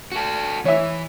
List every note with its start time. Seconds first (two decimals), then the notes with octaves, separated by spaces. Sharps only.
0.12 F#4 A4
0.65 E3 C#5 E5